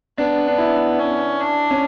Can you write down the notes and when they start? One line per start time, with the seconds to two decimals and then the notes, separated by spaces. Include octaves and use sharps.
0.17 B3 D4
0.48 D4
0.58 E4
0.99 C#4
1.40 D4
1.71 C#4